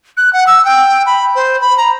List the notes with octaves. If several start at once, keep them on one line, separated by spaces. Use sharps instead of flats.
F#6
F#5
E6
G5
B5
C5
B5
A#5